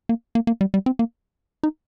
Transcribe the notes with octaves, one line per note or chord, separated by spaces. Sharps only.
A#3
A#3
A#3
G3
G3
C4
A#3
D#4